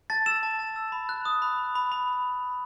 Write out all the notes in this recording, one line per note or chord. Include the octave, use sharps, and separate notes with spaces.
A5 A6
E6 E7
A5
A5
E6
B5
F#6
D#6
B5
B5
B5
B5